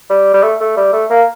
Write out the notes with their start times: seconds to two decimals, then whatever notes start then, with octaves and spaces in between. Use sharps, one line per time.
0.10 G3
0.34 G3
0.43 A3
0.61 A3
0.77 G3
0.93 A3
1.11 A#3